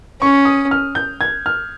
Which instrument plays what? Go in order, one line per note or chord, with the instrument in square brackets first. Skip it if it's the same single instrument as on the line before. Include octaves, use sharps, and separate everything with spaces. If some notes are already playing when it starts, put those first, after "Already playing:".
[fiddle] C#4 [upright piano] C#6
[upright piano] D#6
F6
G6
G#6
F6